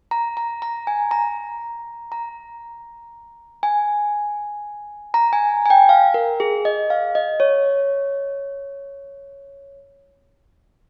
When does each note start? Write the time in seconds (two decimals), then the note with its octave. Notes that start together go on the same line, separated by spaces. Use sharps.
0.11 A#5
0.37 A#5
0.62 A#5
0.87 G#5
1.11 A#5
2.12 A#5
3.63 G#5
5.14 A#5
5.33 G#5
5.66 G#5
5.70 G5
5.89 F5
6.14 A#4
6.40 G#4
6.65 D#5
6.90 F5
7.15 D#5
7.40 C#5